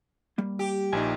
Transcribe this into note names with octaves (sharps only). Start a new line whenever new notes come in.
G3 A#3
G4
A#1 A#2 D#4 G#5